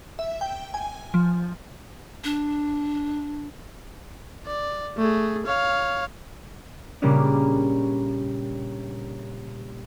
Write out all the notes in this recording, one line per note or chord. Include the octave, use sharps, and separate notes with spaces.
E5
G5
G#5
F3
D4
D5
A3 G#4
C#5 F5
A#2 C#3 G3 A#3 C#4 D4